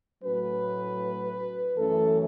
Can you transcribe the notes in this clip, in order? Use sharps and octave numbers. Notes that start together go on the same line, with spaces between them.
A2 F#3 A3 C#4 B4
F#2 E3 A3 C#4 A4